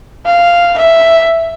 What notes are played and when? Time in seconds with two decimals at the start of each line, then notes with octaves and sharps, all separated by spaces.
0.26 F5
0.78 E5